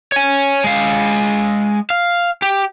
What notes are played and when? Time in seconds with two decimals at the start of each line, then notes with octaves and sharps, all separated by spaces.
0.12 C#5 G#5
0.64 G#3 F5
1.90 F5
2.42 G4